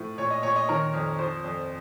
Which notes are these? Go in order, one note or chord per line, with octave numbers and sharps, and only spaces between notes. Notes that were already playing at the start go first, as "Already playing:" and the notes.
Already playing: A2 F3
A#2 C#5
D#5
A#2 C#5
D#5
D#3 A#4 C#5
F2
F3 C5
F2